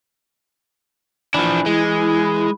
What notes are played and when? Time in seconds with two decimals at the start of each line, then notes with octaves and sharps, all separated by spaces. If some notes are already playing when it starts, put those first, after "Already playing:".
1.34 E3 F3 D4
1.66 G#3 E4